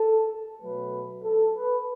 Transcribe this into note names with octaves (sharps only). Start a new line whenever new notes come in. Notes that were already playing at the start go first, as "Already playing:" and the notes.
Already playing: A4
B2 F#3 A3 B4
A4
B4